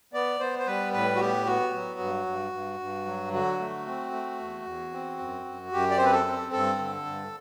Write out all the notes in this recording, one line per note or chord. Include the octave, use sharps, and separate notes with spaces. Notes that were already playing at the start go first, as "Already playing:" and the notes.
B3 D5
B3 C5
C5
G3 B4
A2 B4
F#4
B3 G4
B3 F#4
F#3
G2
G2
G2
G2
F#3
D3 F#4
A3
C4
A3
E2
E2
C4
F#2
F#2
F#2 G4
D5
C4 C5
B4
A4
C4
G2 A4
D3
G2